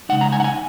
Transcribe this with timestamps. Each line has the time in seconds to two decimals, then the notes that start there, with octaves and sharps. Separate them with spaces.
0.09 C#3 G#3 D#4 F#5
0.21 A#5
0.32 G#5
0.40 F#5
0.44 G#5